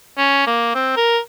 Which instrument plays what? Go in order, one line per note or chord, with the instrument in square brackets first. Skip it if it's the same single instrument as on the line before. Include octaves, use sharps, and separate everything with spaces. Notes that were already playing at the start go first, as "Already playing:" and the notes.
[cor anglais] C#4
A#3
C4
A#4